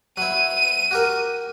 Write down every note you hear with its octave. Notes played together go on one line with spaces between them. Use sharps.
F#3 E4 D#7
F#4 G4 A#4